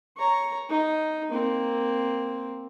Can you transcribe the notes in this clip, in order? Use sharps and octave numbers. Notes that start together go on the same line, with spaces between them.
C#5 A#5
D#4
A#3 C4